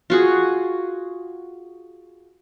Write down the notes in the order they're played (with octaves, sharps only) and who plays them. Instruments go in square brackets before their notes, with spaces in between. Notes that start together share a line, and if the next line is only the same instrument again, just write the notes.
[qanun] F4 F#4 G#4